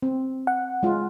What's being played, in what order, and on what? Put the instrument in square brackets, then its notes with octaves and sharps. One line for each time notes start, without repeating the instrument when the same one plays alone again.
[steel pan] C4
[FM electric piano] F#5
[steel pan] G#3 F4